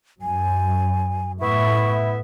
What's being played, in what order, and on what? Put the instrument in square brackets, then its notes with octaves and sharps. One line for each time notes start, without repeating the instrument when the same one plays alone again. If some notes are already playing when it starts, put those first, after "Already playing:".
[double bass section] F#2 [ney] G#5
[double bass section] A2 [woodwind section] B3 E4 E5 [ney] C#6